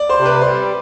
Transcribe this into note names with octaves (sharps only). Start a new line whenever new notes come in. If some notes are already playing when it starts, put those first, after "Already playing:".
Already playing: D5
C5
C3
B4
G3 C5